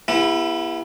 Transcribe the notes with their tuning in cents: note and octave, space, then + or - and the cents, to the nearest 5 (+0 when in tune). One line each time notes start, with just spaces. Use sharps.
B3 -30 E4 +20 G4 +40